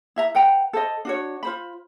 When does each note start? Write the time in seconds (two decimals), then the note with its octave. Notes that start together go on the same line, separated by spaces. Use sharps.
0.16 E4 E5 A#5
0.35 B4 F#5 G5 A#5
0.73 A4 C5 D#5
1.05 D4 F#4 C#5
1.43 F4 C5 B5